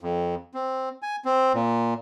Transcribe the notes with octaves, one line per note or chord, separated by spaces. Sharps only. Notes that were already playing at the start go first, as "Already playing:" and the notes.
F2
C4
G#5
C4
A#2